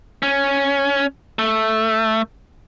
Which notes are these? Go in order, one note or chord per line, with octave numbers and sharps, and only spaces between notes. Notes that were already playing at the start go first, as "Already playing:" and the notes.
C#4
A3